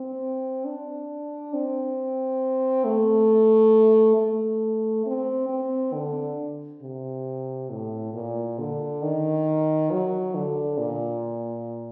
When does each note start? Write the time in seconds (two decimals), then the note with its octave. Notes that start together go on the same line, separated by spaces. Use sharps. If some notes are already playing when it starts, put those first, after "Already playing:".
Already playing: C4
0.65 D4
1.54 C4
2.85 A3
4.17 A3
5.06 C4
5.49 C4
5.94 D3
6.82 C3
7.70 A2
8.14 A#2
8.59 D3
9.02 D#3
9.91 F#3
10.35 D3
10.78 A#2